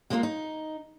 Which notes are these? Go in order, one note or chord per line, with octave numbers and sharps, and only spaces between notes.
G#3 A#3 D4 E4 F4 A#4
D#4